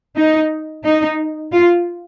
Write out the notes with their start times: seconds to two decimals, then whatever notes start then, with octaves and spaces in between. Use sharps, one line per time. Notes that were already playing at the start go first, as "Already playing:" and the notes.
0.16 D#4
0.85 D#4
1.52 F4